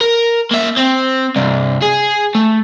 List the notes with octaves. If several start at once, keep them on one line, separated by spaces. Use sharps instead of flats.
A#4
A#3 E5
C4
C2 G2
G#4
A3